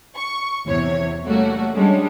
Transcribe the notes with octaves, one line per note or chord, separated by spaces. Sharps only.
C#6
E2 C3 E3 C#5
G3 A3 A#3 C#4 F#4
G3 G#3 C#4 D4